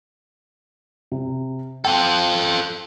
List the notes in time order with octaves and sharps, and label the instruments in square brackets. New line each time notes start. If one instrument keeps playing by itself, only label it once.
[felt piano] C3
[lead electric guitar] F4 A4 [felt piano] G5